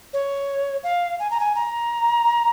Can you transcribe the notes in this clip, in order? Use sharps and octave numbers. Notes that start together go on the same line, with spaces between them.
C#5
F5
G#5
A#5
G#5
A#5